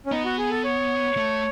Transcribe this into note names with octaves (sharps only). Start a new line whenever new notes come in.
C#4
B3 D#4
F#4
G#4
A4
C#5
A3